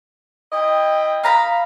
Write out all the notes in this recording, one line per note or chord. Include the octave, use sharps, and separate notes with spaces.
E4 D#5 G5
F5 A#5 B5